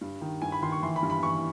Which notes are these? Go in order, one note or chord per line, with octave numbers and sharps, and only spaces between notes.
G2
D#3
G2 G#5
B5
D#3 C6
C#6
E3 C6
B5
G2
B5
E3 C#6